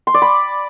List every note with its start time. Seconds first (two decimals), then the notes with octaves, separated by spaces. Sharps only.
0.07 C6
0.14 D5
0.22 B5